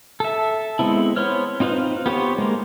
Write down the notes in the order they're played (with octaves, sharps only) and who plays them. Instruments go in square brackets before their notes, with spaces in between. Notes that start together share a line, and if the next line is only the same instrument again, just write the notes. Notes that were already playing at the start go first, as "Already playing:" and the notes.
[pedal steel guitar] A4 E5
G#3 B3 C4 E4
B3 C5 C#5 F6
C4 D#4 F4 B4 C5
B3 G4 C5 C#5
G#3 A#3